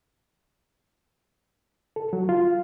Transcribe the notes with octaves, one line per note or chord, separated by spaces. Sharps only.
A4
F#3
F4